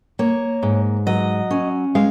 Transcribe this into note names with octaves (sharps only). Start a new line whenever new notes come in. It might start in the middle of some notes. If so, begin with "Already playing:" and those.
A#3 C#5
G#2
F#3 D#5
C#4
G#3 F5